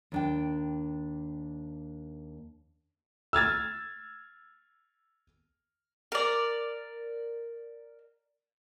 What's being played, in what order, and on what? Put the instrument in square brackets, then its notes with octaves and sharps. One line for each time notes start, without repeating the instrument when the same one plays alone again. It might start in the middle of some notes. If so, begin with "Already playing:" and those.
[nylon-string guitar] D#2 D4 G5
[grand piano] E6 F6 G#6 A6
[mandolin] A#4 D5